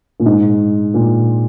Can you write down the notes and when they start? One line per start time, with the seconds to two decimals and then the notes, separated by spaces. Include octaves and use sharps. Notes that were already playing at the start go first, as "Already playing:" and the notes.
0.20 A#2
0.26 G#2
0.94 A#2